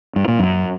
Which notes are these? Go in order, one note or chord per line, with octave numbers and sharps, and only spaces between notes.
G2
A#2
F#2